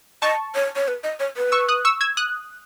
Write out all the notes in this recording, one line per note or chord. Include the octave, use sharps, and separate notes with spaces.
D#5 A5 C#6
C#5
C#5
B4
D#5
C#5
B4
C#6 E6
D#6 F#6
C#6 E6
E6 G#6
D#6 F#6